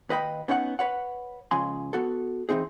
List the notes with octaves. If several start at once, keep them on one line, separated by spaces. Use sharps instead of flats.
D#2 B4 D#5 G5 B5
B3 C#4 D#4 C#5 F#5
B4 C#5 F#5
C#2 C#3 F3 G#5 C6
B3 F#4 A4
E3 G3 C4 D#4 G#4